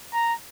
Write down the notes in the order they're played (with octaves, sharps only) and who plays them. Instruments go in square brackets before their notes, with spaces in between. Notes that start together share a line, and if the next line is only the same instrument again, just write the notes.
[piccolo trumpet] A#5